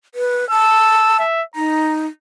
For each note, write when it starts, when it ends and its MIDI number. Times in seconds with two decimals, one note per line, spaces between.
0.15 0.48 71
0.50 1.22 81
0.50 1.17 88
1.19 1.43 76
1.56 2.07 63
1.56 1.95 82